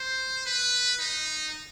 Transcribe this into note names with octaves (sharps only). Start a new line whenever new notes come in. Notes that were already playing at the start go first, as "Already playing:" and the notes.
Already playing: C5
B4
D#4